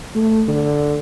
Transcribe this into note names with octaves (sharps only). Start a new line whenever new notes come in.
A3
D3